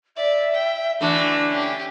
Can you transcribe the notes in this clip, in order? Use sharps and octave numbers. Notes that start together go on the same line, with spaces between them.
D5 E5
G5
D3 E3 A3 D4 F#4
C#4 G4